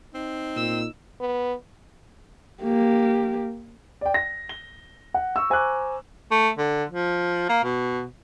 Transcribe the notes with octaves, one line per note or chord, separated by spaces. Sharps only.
C4 D#4
A#2 E6
B3
A#3 G4
D5 G5
A#6
G7
F#5
C#6 E6
C5 G#5 A#5 C#6 D6 F#6
A3
D3
F3
A#3
B2